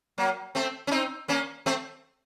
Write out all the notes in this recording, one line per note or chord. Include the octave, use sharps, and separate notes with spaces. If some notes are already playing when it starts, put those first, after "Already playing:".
F#3 A#3
A3 C4
C#4
C4 D#4
A#3 C#4
A3 C4